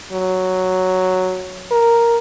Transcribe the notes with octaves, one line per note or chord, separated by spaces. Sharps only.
F#3
A#4